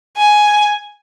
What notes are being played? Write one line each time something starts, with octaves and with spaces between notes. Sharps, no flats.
G#5